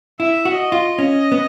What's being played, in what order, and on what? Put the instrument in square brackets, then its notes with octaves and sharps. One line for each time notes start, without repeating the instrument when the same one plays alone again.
[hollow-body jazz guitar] E4 [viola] E5
[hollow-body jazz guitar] F#4
[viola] D#5
[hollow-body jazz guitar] F4
C#4
B3